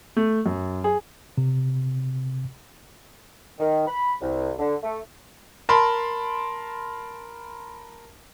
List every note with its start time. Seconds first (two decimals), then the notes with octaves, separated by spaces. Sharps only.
0.17 A3
0.46 F#2
0.84 G#4
1.38 C3
3.59 D#3
3.87 B5
4.21 C2
4.59 D3
4.83 A3
5.69 A#4 A5 B5 C6